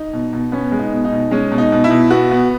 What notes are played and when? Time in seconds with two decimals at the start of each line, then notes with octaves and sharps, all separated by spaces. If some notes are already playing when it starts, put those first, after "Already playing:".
Already playing: D#4
0.13 B2
0.33 B2
0.52 B3 C#4
0.72 G#3
0.79 D#4
0.93 B2
1.05 D#4
1.12 B2
1.31 G#3 C#4
1.51 B2
1.58 D#4
1.72 B2
1.84 E4
1.91 B2
2.10 B3 F#4
2.31 B3